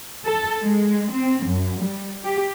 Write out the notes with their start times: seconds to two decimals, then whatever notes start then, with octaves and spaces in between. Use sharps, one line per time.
0.24 A4
0.60 G#3
1.12 C4
1.45 F#2
1.79 G3
2.23 G4